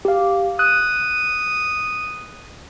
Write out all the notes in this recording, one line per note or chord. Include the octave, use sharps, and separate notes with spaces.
G4 F5
D#6 F#6